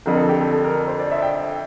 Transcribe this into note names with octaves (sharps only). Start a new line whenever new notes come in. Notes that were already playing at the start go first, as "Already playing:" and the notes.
F2 D3 F3 C4 A#4
A4
G4
A4
A4
A#4
C5
D5
E5
G5
G5